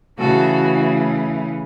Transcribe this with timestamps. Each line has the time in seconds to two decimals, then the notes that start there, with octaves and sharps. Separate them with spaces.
0.17 C#3 E3 A3 F#4 A4
0.50 F#4